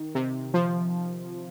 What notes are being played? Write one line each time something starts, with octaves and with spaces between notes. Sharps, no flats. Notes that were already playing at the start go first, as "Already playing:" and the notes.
Already playing: D#3
C3
F3